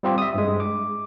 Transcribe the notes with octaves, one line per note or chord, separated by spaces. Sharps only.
G3 C4 F4 G4
E5 D#6
G2 G#3
D6